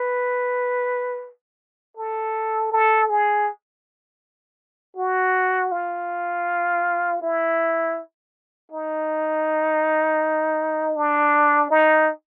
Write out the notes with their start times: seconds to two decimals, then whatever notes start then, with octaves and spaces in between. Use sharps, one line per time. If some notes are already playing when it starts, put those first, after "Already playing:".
Already playing: B4
1.97 A4
2.72 A4
3.10 G#4
4.96 F#4
5.72 F4
7.21 E4
8.71 D#4
10.96 D4
11.70 D#4